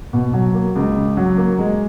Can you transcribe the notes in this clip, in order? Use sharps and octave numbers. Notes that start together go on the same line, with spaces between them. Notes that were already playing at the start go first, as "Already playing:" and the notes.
B2
F#3
A#3
C#2
C#3
F#3
A#3
G#3